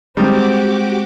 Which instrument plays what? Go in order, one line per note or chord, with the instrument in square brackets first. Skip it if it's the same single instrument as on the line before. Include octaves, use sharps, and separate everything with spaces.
[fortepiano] D#3 G3 [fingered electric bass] G#3 [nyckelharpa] C4 [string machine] F#4 G4 D6